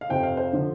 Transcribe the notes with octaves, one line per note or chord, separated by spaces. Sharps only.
F5
F2 C3 F3 G5
F5
C5
D3 F3